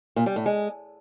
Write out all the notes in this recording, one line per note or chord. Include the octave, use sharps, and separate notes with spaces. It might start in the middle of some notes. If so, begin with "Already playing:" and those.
A#2
G3
A2
G#3